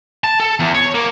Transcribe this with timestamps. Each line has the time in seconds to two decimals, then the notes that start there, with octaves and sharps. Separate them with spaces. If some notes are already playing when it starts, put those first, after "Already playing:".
0.24 A5
0.40 A4
0.60 E2
0.74 C#5
0.95 A#3